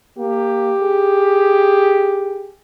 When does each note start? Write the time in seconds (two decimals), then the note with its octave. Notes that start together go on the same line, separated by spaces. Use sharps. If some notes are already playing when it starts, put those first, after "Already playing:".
0.18 A#3 G4
0.82 G#4